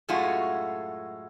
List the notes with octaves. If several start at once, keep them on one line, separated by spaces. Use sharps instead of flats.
F#2 A2 G#3 A3 F4 F#4